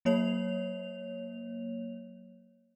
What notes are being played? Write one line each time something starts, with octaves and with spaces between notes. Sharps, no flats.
F#3 A#3 C#5 F7